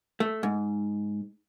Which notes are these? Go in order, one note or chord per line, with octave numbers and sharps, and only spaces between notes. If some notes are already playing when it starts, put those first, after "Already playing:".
A3
G#2